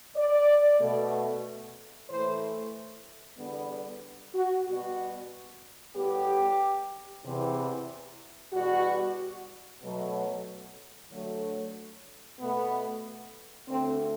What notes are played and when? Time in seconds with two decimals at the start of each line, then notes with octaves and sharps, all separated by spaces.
0.17 D5
0.81 B2 A3
2.09 A2 E3 A3 C5
3.38 E2 D3 G3 B3
4.35 F#4
4.67 B2 G3 B3 F#4
5.96 A2 G3 B3 G4
7.24 E2 C3 E3
8.53 E2 B2 G3 F#4
9.82 B2 F#3 A3
11.11 D2 D3 F#3 A3
12.40 B2 A3 B3
13.68 D2 D3 A3 C4